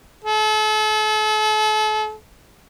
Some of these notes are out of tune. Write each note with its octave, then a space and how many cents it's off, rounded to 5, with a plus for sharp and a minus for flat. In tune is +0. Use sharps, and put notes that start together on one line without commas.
A4 -40